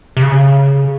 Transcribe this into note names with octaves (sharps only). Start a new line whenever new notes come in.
C3
C#3